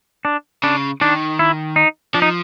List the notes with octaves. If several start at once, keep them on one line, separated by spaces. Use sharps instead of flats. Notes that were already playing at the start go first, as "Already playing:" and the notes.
D4
C#3 D4
D#3 D4
E4
D#4
F3 D4
D#4